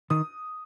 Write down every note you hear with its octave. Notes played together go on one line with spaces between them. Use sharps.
D#3 D#6